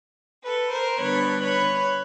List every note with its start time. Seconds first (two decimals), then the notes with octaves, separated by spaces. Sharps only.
0.43 A4 B4
0.72 A#4 C5
1.00 D3 G3 B3 D4 B4 C#5
1.42 B4 C#5